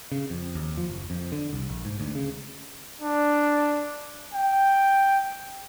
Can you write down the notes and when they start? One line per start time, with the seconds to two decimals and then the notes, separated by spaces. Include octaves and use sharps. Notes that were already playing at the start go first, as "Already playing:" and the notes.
0.12 C#3
0.30 F2
0.55 D#2
0.77 F3
0.90 F#1
1.10 F2
1.32 D3
1.53 C2
1.69 A#1
1.85 G#2
2.00 D2
2.15 C#3
3.01 D4
4.33 G5